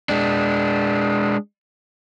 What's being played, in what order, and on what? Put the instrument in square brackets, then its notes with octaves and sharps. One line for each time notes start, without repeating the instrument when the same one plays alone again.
[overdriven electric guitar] G#3 D4